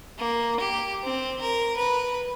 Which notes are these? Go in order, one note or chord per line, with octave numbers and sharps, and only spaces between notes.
A#3
G4
C4
A#4
B4